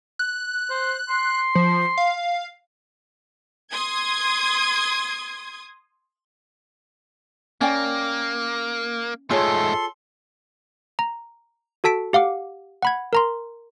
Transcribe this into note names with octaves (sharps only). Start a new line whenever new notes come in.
F#6
C5
C6
F3
F5
C6 D#6 G#6
A#3 C#4 D5 G5
G#2 A3 F4 G#4 A4 C#5 C6
A#5
F#4 A4 A5 B6 D7
G4 F5 F#5 D6
F#5 B5 G#6
A#4 A#5 C6